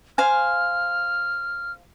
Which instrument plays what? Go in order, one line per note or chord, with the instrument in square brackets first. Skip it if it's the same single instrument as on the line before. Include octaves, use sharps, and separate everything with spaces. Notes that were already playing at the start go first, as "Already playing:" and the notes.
[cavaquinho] C5 F5 G#5 [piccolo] F6